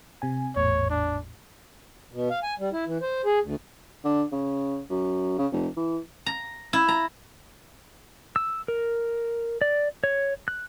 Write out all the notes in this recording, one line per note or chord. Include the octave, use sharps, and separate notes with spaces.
C3 G#5
G#1 E2 A2 C#5
D4
B2
F5
G#5
G3
E4
E3
C5
G#4
D2
D3
C#3
F#2
C#3
F1
E3
A#5
E4
A#5
E6
A#4
D5
C#5
F#6